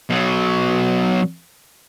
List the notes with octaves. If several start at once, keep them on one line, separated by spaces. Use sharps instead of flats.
B2 F#3